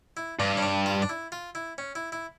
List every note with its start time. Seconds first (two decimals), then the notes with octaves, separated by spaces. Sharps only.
0.17 E4
0.39 G2 D4
0.57 C#4
0.63 D4
0.86 F4
1.02 D4
1.09 E4
1.32 F4
1.55 E4
1.78 C#4
1.95 E4
2.12 E4